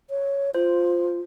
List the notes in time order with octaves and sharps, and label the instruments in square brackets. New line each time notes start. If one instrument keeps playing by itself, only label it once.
[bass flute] C#5
[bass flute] F4 [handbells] C5